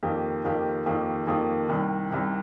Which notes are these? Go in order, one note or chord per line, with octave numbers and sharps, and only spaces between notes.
F2 D#3 A#3 G4
F2 D#3 A#3 G4
F2 D#3 A#3 G4
F2 D#3 A#3 G4
C2 C3 D#3
C2 C3 D#3